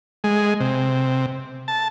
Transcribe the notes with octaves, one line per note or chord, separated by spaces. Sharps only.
G#3
C3
A5